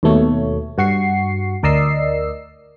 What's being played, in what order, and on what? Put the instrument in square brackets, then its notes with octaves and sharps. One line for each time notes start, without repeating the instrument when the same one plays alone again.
[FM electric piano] D#2 B2 A3 C#5
G2 F#4 C#6 C7
D2 A#4 D5 D#5 E6 C7